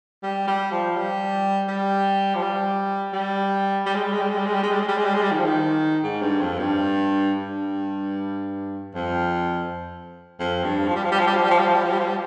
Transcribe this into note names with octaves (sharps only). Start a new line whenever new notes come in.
G3
G3
F3
G3
G3
F3
G3
G3
G3
G#3
G3
G#3
G3
G#3
G3
G#3
G3
G#3
G3
G#3
G3
G#3
G3
G#3
G3
D#3
F3
D#3
G#2
G2
F2
G2
G2
F2
F2
G2
F3
G3
F3
G3
F3
G3
F3
G3
F3
G3
F3
G3
F3
G3
F3
G3